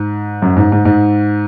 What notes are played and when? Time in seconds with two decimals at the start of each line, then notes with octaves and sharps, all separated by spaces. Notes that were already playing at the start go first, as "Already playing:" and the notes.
Already playing: G#2
0.42 F#2
0.56 G#2
0.72 G#2
0.85 G#2